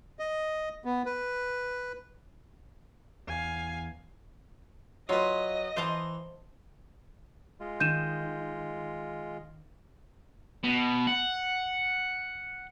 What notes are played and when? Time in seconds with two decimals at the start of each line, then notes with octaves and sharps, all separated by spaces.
0.19 D#5
0.85 B3
1.06 B4
3.28 E2 F5 G#5
5.09 F#3 F4 B4 D#5
5.77 E3 C5 A5 A#5 C6
7.60 G#3 F4
7.80 D#3 G6 D#7 E7
10.64 B2
11.07 F#5